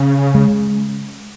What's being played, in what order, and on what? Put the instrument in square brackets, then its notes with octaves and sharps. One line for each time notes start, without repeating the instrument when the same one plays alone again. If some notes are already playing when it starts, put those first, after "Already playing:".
Already playing: [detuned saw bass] C#3 [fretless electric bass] C#4
[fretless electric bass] G#3